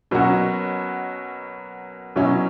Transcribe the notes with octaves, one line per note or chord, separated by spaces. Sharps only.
B2 F#3 A#3 C#4 F#4
B2 F#3 C#4 E4